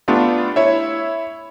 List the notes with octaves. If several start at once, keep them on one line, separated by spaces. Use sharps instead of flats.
A3 B3 D4 F4 G4
E4 C#5 E5